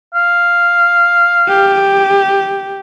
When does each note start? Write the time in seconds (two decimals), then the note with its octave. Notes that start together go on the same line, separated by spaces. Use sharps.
0.14 F5
1.48 G4